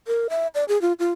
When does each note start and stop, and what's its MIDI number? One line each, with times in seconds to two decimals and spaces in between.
0.07 0.28 70
0.30 0.47 76
0.55 0.64 74
0.68 0.80 68
0.82 0.93 65
0.99 1.12 65